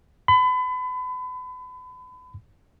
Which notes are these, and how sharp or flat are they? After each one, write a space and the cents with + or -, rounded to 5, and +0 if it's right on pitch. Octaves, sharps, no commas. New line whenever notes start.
B5 +35